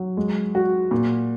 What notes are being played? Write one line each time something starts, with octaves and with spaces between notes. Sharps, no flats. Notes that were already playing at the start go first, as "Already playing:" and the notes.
Already playing: F#3
G#3
F#4
A#2